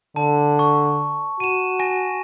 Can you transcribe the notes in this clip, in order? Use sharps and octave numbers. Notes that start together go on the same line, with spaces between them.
D3 A5
C#6
F#4 D#7 E7
G#5 A#6